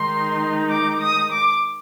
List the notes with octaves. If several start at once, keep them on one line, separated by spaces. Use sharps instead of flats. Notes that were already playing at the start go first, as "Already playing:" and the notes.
Already playing: D#3 G#3 D#4 C6
D6
D#6
D6